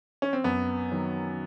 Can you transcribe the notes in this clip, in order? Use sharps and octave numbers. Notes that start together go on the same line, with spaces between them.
C#4
C4
F#2 B3
D#3 F#3